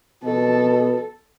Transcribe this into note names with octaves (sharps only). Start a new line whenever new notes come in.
B2 A4